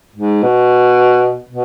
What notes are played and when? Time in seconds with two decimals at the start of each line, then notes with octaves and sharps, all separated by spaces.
0.16 G#2
0.43 B2
1.49 B2